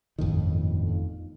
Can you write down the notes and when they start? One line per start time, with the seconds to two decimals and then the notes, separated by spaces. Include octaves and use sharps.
0.18 G1 F2 A2 D#3